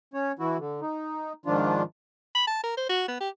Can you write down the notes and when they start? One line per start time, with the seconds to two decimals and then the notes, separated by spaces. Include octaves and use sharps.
0.14 C#4 C#5
0.39 E3 E4 F#4
0.58 D3
0.81 D#4
1.46 G#2 D#3 F3 D4 F4
2.35 B5
2.47 A5
2.64 A#4
2.77 C5
2.89 F#4
3.08 B3
3.20 G4